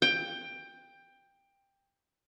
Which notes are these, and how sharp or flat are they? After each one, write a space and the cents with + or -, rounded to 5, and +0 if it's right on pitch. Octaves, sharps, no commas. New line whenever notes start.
G5 +15